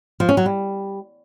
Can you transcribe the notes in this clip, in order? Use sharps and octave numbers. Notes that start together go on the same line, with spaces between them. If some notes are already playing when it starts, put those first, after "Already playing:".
F3
C#4
F#3
G3